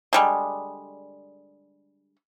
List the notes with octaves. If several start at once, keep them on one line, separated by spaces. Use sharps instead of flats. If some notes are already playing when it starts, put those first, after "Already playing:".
D3 G3 G#3